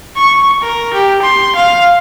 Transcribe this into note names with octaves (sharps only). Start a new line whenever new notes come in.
C#6
A#4
G4
C6
F5